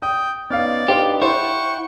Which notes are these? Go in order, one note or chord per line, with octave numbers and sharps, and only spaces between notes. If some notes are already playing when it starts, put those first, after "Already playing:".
G5 D#6
B3 C#4 D#4 D5 F5 F6
D4 D#4 G4 B4 C5 F5
E4 C5 F#5 G5 C#6